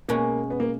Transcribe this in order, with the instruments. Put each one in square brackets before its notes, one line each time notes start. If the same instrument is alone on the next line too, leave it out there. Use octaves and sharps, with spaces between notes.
[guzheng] B2 G#3 C#4 [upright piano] A#3
[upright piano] B3
A#3